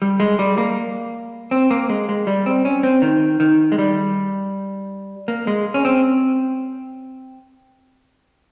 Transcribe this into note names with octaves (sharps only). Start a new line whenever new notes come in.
G3
G#3
G3
A#3
C4
A#3
G#3
G#3
G3
C4
C#4
C4
D#3
D#3
G#3
G3
A#3
G#3
C#4
C4